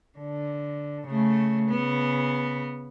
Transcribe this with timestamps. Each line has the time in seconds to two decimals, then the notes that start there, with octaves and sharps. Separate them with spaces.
0.19 D3
1.08 C#3 A3
1.70 C#3 B3